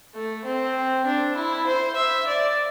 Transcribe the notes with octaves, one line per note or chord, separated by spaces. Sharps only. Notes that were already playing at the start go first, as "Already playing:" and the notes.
A3
C4
D4
E4
C5
E5
D5